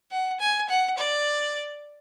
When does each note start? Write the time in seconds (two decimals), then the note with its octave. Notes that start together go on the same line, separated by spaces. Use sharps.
0.11 F#5
0.40 G#5
0.69 F#5
0.98 D5